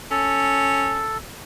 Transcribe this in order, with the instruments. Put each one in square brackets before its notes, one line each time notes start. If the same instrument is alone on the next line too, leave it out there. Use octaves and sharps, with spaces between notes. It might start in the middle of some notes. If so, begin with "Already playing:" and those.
[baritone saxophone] C#4 [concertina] A4